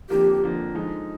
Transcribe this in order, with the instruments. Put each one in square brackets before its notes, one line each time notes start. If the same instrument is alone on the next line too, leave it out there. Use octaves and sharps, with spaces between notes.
[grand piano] F2 D3 F3 A#3 [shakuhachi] G4
[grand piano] F2 D3 F3 A#3
D3 F3 G#3 D#4